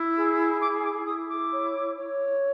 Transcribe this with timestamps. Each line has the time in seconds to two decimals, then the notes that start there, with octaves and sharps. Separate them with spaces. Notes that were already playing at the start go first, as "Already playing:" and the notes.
Already playing: E4
0.16 G#4
0.61 E4 D6
0.84 D6
1.06 E4 D#6
1.29 D6
1.52 C#5
1.97 C#5